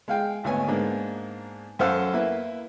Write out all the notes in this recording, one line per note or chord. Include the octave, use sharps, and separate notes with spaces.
G#3 F5 G5
G#1 D2 B3 C#5 G#5
G#2 G#3 A#3 B3 D4
F#2 A4 C5 F5 F#5 E6
A#3 E4 B4